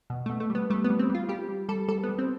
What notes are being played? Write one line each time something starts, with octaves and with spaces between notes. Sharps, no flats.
B2
B2 A3
A3
G3
B3
G3 A3
B3
G3
C4
G3
F4
G3 G4
G3
G3 A4
G3 A4
B3
G3
C4